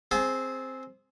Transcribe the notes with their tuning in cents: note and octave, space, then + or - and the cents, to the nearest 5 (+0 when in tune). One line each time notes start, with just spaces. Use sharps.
C4 +0 G#4 +0 A5 -35